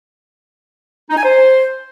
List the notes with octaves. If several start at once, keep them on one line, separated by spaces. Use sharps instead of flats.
D#4
G#5
C5